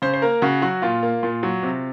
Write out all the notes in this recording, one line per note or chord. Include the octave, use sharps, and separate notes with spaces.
C#3 C5
C5
A#3 A#4
C#3 F#4
F#3 F#4
A#2 F4
A#3
A#2
F#3
C3